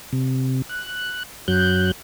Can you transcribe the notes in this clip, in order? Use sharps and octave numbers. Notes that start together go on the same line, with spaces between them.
C3
F#6
F#2 F#3 F#6 G6